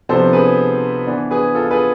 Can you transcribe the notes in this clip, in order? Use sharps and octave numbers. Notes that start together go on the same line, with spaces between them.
C3 F3 B3 D4 A4 C5
G#4 B4
E3 B3 D4
G#4 B4
F4 A4
G#4 B4